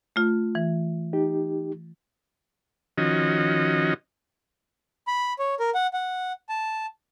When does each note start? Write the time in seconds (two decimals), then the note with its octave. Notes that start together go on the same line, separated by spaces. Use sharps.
0.16 A3 F4
0.55 E3
1.13 D#4 G4
2.98 D#3 F3 C#4 F#4 D#5
5.07 B5
5.39 C#5
5.60 A#4
5.75 F#5
5.93 F#5
6.49 A5